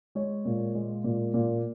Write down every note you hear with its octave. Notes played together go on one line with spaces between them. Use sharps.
G#3 C#5
A#2
G#3
A#2
A#2